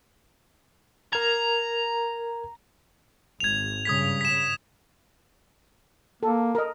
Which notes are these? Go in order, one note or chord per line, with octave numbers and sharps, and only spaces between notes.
A#4 A#5 G#6
G#1 G#6 F7
G2 C#3 D#6 G#6 B6
B6 E7
A#3 A4
A#4 D#5